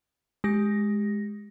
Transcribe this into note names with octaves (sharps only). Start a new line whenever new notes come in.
G#3 G4 A#6